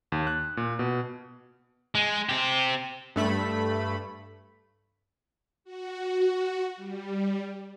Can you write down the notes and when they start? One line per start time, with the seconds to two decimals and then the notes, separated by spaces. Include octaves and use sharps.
0.12 D#2
0.27 F#6
0.57 A#2
0.79 B2
1.95 G#3
2.29 C4 G4
3.16 G2 A3 B5
5.64 F#4
6.76 G3